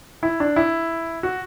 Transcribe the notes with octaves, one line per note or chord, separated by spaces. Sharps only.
E4
D4
E4
F#4